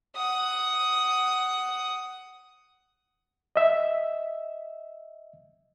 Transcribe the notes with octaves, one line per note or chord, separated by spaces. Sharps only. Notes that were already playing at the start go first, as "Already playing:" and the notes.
F#5 D#6
D#5 E5